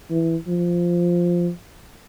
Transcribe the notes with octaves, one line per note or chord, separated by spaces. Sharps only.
E3
F3